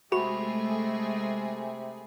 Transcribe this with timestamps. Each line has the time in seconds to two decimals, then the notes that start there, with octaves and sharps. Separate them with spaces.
0.12 C3 G#3 A3 F#4 G#4 B5